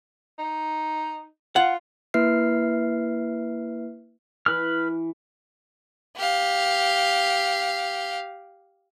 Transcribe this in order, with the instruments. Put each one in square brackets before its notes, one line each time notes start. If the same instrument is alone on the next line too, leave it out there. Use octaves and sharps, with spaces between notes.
[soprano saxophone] D#4
[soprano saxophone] F4 [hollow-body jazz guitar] F#5
[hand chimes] A#3 E4 B4 E5 F6 C7
[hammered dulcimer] E3 [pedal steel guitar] B4 F6
[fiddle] G4 F5